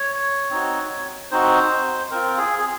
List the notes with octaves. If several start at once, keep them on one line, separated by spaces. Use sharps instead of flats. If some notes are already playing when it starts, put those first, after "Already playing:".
Already playing: C#5
C4 D#4 F#4
C4 D#4 F#4 C5
C4 F4 A#4
G#4
G#4